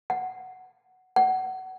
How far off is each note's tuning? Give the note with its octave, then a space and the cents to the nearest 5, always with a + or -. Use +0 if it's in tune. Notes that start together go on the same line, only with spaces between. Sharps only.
F#5 +5
F#5 +25